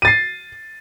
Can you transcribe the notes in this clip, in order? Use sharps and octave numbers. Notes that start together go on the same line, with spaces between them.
A6 C7 D#7